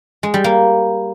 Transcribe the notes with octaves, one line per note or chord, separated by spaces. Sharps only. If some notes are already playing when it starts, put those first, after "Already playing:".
G#3
G3
A#3